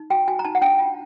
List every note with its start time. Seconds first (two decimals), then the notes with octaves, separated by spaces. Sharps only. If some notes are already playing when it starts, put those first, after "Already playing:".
Already playing: D#4
0.10 F#4 G5
0.28 F#4 G#5
0.39 A#5
0.45 D#4 A5
0.55 F#5
0.61 D4 G5
0.79 F4